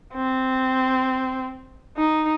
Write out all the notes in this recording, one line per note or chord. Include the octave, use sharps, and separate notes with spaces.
C4
D#4